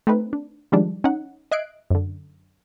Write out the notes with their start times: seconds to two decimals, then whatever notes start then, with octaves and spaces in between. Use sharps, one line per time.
0.07 A3 C4 D#4 B4
0.33 D4
0.72 D#3 F3 G3 G#3 D4
1.04 C#4 D#4 F#5
1.51 D#5 E5 F#6 G#6 C7 D7
1.90 F#2 D3